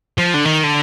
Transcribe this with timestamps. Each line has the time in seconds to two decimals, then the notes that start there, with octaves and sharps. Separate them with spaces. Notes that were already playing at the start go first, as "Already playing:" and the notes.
0.18 F3
0.34 D3
0.45 D#3
0.64 D3